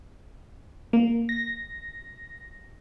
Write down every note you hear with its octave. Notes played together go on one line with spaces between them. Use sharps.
A#3
A#6